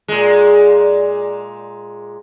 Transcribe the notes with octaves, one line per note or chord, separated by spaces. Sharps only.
A#2 G#3